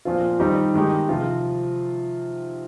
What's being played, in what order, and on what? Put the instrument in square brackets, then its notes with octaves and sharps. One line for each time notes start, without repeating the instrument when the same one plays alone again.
[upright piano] A#2 F3 C4 F4
D#3 G3 C4 D#4 G4
D#3 G#3 D#4 G4
C3 F3 C4 F4